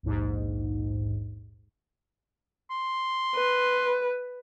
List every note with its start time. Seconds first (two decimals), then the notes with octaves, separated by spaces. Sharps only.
0.03 A#1 D#2 G#2
2.71 C6
3.35 B4